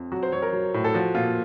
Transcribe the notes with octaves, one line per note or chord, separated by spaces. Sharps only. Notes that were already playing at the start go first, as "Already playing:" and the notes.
Already playing: F2
F#3 F#4
C5
F#3 C#5
A#4
F#3
A2
A4
F3 F#4
A#2 F4